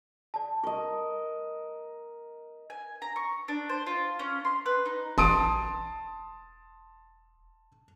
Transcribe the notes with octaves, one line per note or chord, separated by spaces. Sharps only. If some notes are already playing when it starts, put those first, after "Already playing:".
D5 A5
A#4 D#5 C#6
G#5
A#5
C#6
D4
C5
F4
C#4
C6
B4
D#4
E1 A1 A5 C6 D#6 D7